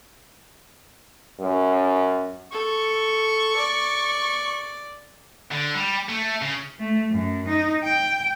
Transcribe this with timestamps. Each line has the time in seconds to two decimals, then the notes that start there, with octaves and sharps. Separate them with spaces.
1.40 F#2
2.52 A4 C#6
3.57 D5
5.51 D3
5.74 G3
6.09 A3
6.42 C#3
6.79 A3
7.11 F#2
7.48 D#4
7.84 G5